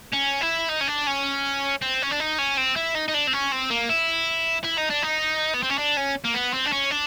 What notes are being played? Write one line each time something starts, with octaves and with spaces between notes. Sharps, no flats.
C#4
E4
D#4
C#4
D4
C#4
C4
C#4
D4
D#4
C#4
C4
E4
D#4
D#4
D4
C4
C#4
C4
A#3
E4
E4
D#4
D4
D#4
B3
C4
C#4
D4
C#4
A#3
B3
C4
D4
C#4
D4